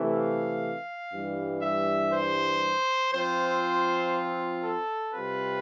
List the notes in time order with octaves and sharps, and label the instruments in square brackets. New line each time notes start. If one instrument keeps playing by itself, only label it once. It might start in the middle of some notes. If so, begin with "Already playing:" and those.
Already playing: [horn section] C3 E3 A3
F5
G2 E3 G3
E5
C5
F3 C4 F4 C5
A4
C3 G3 C4 F4 B4